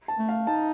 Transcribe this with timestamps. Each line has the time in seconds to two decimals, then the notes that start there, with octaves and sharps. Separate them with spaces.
0.08 A5
0.19 A3
0.29 F5
0.47 D#4 A5